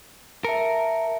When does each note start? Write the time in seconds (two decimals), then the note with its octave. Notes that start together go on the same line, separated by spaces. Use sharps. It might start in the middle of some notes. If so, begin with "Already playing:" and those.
0.44 A#4 E5 A5 C#7